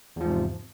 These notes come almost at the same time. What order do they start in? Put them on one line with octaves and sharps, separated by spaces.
E2 F3 G#2 C3